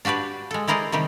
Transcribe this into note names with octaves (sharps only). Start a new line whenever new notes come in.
D4 F#4 G4 B4 D5
G#3 A4
G#3 E4 A#4 C5 D5 D#5
C3 D#3 G3 G4